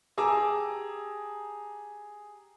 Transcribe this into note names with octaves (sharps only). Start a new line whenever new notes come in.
G4 G#4 A5 A#5 D6 E6